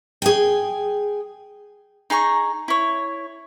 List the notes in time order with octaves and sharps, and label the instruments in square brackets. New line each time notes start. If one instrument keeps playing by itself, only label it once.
[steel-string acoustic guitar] G#4 G5
[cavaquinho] D#4 G#4 A#5 C#6
E4 C#5